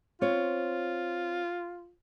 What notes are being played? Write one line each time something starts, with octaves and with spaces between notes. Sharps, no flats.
C4 F4 C#5